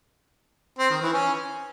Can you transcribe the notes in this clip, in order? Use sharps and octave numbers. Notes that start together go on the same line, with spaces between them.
C4
D#3
E3
C#4